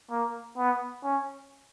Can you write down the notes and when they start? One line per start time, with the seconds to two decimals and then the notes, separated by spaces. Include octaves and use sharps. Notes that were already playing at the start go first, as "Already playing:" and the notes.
0.10 A#3
0.57 B3
1.03 C#4